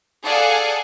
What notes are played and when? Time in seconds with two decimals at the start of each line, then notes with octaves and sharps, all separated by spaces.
0.22 G#4 A4 D5 F5 F#5 G#5